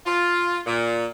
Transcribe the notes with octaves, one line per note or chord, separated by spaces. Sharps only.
F4
A#2